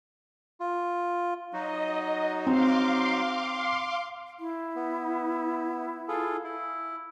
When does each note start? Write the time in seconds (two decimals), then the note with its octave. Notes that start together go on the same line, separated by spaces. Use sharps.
0.60 F4
1.53 F#3 D#4 F#4 D#5
2.47 C4 F5 C6 D6
4.39 E4
4.76 B3
6.08 F4 G#4 A4
6.44 E4